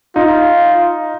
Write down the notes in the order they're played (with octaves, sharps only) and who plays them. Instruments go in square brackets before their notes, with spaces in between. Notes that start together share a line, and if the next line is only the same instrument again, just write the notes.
[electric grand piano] D#4 [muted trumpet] F4